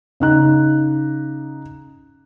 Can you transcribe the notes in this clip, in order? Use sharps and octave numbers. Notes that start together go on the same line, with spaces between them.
C#3 D#4 F#6